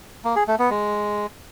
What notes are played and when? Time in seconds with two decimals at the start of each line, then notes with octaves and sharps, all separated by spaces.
0.25 A#3
0.36 G#4
0.47 A3
0.59 B3
0.70 G#3